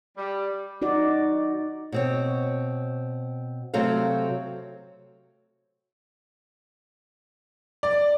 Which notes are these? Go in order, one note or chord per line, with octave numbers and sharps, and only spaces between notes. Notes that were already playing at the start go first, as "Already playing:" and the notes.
G3
D#4 F#4 D5
B2 C4 C#5
C3 F#3 A3 C4 F5
D5